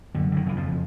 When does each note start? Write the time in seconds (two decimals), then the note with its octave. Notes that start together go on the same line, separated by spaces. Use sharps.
0.14 F#2 D3
0.32 D3
0.37 D#3
0.46 C#3 E3
0.57 F2 F3